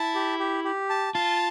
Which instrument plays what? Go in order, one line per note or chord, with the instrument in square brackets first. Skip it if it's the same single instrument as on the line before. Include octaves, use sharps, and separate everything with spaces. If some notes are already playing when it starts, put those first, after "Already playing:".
Already playing: [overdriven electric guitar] E4 [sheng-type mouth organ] A5
[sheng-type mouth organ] G4
G4
G4
A5
[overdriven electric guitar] F4 [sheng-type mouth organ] A5